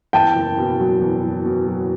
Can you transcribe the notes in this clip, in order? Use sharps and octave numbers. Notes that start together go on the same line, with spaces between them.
E2 G5 A5
F#1
B2
F#3
E2
F#1
B2
F#3